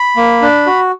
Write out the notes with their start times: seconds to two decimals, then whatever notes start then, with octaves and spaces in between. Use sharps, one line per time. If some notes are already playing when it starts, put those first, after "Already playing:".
Already playing: B5
0.17 A#3
0.42 D4
0.67 F#4